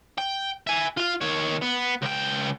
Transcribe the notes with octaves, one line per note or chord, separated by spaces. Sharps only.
G5
E5 G#5
F4 F5
D#3 C#5
B3
C#2 G5